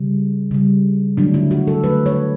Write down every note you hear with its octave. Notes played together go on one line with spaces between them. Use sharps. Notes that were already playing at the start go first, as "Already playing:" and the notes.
Already playing: C#3 G3
C#3 G3
D3 F#3 A3 D4
E4
F#4
A4
D3 F#3 A3 B4
C#5